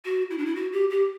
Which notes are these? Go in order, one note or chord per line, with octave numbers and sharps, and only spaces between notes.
F#4
E4
D4
E4
F#4
G4
G4